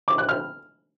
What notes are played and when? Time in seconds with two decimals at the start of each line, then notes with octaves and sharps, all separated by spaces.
0.08 D6
0.18 F#6
0.29 F6